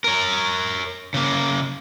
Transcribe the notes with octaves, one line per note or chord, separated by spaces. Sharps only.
A#4 C#5
C#3 A#3